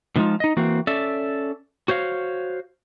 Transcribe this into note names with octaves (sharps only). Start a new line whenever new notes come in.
A2 D3 F3 G#3 D#4 F4
D#4 D#5
E3 A#3 C4 F#4
C#4 A4 D5 E5
F#4 C5 C#5 F5